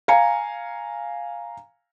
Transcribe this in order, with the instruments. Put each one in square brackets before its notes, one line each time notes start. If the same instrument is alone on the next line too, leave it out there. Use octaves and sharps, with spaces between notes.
[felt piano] F5 G#5 A#5 C#7